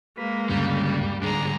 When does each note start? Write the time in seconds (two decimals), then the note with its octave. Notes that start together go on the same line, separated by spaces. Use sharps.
0.17 G#3 A#3 B4
0.49 D2 G2 C#3 G3
1.21 G#2 D3 G3 D4 G#4 A#5